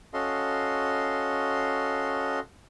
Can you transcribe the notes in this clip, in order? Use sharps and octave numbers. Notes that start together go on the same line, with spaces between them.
C#4 F#4 A4 D#5 F5 C6